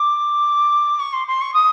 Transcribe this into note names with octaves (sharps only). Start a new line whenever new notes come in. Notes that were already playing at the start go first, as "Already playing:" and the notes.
Already playing: D6
C#6
C6
C6
C#6
D#6